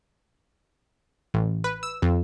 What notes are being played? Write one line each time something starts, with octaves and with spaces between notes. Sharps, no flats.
A1
B4
E6
F2